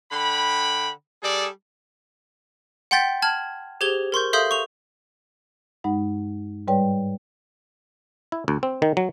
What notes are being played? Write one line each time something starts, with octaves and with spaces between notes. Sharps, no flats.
D3 G5 B5
G3 G#4 A4 D5
F#5 G5 C6 G6 A6 B6
A5 F6 G#6 F#7
G4 G#4 C5 G#6 F7 G7
A#4 C6 C#6 G6
A4 E5 F5 C6 D#6 G6
C#6 F7
G2 G#3 D#4 F#5
G#2 G3 B4 C#5 D5 G5
E4
D2
C4
D#3
F#3